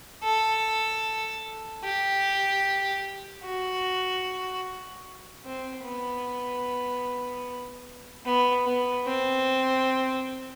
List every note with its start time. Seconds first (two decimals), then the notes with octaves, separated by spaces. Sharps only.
0.23 A4
1.84 G4
3.44 F#4
5.45 C4
5.85 B3
8.25 B3
8.65 B3
9.06 C4